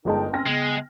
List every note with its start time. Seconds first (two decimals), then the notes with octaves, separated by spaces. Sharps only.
0.05 G1 G#3 D#4 A#4 G5 A5
0.33 C4 C#4 G5 F6 A#6
0.46 C#3 G#3 B3